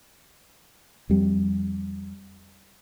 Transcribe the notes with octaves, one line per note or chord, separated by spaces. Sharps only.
F2 G3